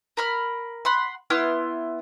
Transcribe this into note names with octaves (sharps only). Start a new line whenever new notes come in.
A#4 B5 F6
F#5 B5 C6
B3 E4 C6 F6